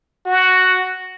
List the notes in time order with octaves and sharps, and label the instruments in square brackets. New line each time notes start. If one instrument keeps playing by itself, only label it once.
[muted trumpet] F#4